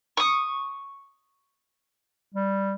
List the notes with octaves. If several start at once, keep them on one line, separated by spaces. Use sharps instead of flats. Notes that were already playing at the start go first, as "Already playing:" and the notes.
C#6 D#6
G3